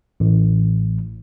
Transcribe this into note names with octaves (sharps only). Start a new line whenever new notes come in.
A1